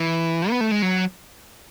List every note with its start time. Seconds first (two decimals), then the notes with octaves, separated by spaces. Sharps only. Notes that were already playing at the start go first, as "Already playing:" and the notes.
Already playing: E3
0.50 B3
0.61 A3
0.71 G#3
0.82 F#3